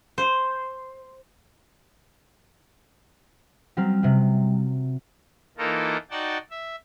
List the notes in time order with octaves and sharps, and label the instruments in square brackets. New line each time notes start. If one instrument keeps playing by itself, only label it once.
[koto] C5
[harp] F#3 C4 F6 [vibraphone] G3
[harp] C3 F#3
[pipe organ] E3 A#3 D#4 F4 A4 A#4
D#4 F#4 D5 F#5 G5 A5
E5